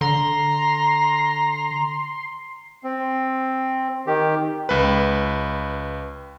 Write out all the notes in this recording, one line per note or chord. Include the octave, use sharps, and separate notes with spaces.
D3 A#5 C6
C4
D#3 G4
C#2 B4